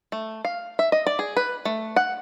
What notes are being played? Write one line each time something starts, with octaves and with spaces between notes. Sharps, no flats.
A3
F5
E5
D#5
D5
G#4
B4
A3
F#5